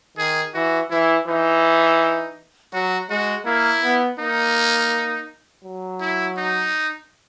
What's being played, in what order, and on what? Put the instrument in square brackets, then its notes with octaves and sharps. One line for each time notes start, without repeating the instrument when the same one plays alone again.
[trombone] D#3 [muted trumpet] G#4
[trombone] E3 [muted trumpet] F#4
[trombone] E3 [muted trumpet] E4
[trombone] E3 [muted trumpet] D#4
[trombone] F#3 [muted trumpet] F#4
[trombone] G#3 [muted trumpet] F#4
[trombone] A#3 [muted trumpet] E4
[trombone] B3
[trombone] A#3 [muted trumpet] D#4
[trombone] F#3
[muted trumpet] E4
D#4